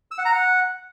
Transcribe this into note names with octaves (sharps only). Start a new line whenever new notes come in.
E6
F#5
A#5
F#5